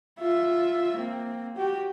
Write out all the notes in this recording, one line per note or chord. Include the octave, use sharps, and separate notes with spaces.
F4 E5
A#3 C4
F#4 G4